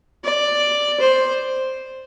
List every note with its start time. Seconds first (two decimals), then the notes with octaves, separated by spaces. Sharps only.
0.24 D5
1.00 C5